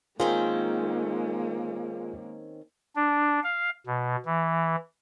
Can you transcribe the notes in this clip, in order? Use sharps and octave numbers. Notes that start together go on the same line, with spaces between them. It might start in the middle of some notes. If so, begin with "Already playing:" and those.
D#3 G#3 A#3 C4 C#4 F4 G#4 F5
D4
F5
B2
E3